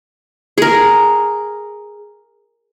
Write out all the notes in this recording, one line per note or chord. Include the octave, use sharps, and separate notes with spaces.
G#4 A#4